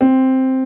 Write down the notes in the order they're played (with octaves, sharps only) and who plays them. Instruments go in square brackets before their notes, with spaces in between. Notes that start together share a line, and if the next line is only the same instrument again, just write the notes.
[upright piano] C4